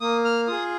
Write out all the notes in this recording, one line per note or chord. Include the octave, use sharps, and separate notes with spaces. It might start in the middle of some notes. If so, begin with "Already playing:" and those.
A#3 D#6
F6
F4 G#4 D#6